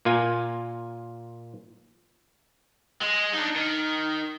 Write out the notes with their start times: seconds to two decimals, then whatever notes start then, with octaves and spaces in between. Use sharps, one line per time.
0.05 A#2 A#3 F4 G#5
3.01 G#3
3.33 D4 D#4
3.56 D#3